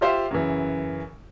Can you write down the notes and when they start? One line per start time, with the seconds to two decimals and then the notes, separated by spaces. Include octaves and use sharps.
0.01 F4 G4 C5 E5 F5
0.31 F#2 C#3 E3